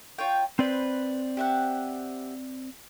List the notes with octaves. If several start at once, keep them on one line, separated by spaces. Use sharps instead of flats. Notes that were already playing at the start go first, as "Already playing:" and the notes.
F4 C#5 G5
C4 B4 C5 D5 B5
G4 E5 F#5